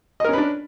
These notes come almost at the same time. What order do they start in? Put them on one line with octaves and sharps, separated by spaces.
D#5 A#4 C#4 B4 D4